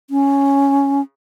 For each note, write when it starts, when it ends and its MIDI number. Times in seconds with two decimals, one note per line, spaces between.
0.10 1.01 61